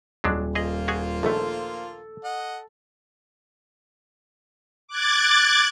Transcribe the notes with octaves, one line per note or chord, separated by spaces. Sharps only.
D#1 F#3 G#3 D4
A#3 F4 G#4 C5 D#5
F#4 G#4 G#5
A#1 D#2 A3 A4
D#5 F#5
D6 F#6 G#6 A6